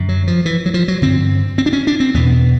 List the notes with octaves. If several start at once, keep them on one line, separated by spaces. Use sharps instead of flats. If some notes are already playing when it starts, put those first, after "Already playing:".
Already playing: F#2 D3
F#3
F3
E3
F#3
F3
F#3
G2 D3 C4
C4
D4
C#4
D4
C4
E2 B2 B3